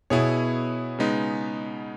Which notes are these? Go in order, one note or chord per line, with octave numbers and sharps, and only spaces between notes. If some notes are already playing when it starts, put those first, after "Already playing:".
B2 B3 E4 G#4 C#5
C#3 G#3 B3 D#4